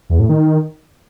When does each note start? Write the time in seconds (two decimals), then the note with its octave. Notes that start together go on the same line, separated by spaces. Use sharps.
0.10 E2
0.19 A2
0.29 D#3